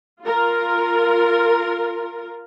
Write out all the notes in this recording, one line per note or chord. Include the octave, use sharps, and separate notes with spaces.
F4 A#4